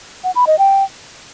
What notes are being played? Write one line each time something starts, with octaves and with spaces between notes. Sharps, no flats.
F#5
B5
D#5
G5